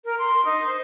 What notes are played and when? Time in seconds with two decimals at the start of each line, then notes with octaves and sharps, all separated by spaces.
0.04 A#4
0.19 C6
0.45 D#4
0.67 C5